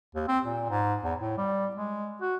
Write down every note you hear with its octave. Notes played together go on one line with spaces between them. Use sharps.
D#2
C4
A#2
G#2
E2
A2
G3
G#3
F#4